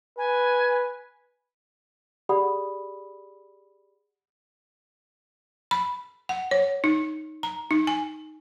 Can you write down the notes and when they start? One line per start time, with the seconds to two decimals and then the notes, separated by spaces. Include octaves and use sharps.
0.18 B4 G#5
2.29 G4 G#4 D5 F#5 B5 D#6
5.71 B5
6.29 F#5
6.51 C#5
6.84 D#4
7.43 A#5
7.71 D#4
7.87 G#5